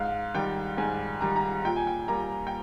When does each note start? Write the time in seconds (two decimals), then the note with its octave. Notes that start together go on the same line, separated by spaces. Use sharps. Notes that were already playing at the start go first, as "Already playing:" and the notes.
Already playing: G#2 F5
0.34 D#3 G3 G5
0.77 G#2 G#5
1.21 D#3 G3 A#5
1.36 A#5
1.65 A#2 G5
1.76 G#5
1.87 G5
2.08 G3 A#3 A#5
2.47 G5